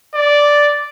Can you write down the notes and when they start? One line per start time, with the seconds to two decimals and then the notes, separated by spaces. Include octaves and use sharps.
0.15 D5